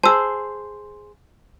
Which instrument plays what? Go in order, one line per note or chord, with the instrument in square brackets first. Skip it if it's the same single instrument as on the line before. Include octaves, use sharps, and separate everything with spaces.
[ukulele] G#4 C5 [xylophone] A5 E6